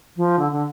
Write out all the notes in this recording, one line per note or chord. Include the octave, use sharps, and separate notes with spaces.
F3
D3
D3